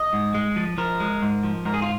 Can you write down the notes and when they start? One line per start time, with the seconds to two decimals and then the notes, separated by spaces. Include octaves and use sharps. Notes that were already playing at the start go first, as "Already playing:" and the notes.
Already playing: D#5
0.13 G#2
0.35 G#3
0.56 F3
0.78 F3 A#4
1.00 G#3
1.22 G#2
1.43 F3
1.65 G#2 A#4
1.74 G#4
1.82 F4